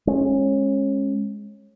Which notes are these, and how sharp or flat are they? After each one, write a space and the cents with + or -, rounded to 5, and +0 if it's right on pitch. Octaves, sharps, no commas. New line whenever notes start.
G#3 +0 C#4 -25